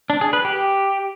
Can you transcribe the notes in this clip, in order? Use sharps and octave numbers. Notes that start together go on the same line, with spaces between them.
D4
G#4
B4
G4